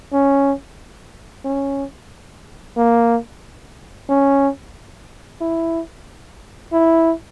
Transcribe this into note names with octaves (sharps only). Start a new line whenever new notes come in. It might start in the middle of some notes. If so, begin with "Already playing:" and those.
C#4
C#4
A#3
C#4
E4
E4